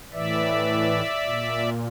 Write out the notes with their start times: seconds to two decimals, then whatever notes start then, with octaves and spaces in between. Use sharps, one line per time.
0.12 A2 E3 D5 E5
1.25 A#2